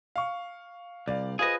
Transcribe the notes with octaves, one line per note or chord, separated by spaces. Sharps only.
F5 C#6
C2 D5 F5
F4 G#4 B4 C5 D#5